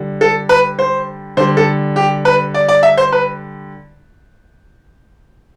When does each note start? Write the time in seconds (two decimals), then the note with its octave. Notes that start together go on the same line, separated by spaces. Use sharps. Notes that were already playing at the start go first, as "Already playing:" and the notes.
Already playing: D3 G3
0.21 A4
0.49 B4
0.79 C5
1.37 D3 G3 C5
1.57 A4
1.96 G4
2.25 B4
2.54 D5
2.68 D5
2.83 E5
2.97 C5
3.12 B4